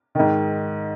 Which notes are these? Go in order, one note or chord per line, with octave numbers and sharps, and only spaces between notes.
G#2 D#3